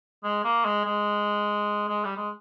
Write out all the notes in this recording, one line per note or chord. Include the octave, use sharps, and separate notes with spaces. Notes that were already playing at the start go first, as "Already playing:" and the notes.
G#3
A#3
G#3
G#3
G#3
G3
G#3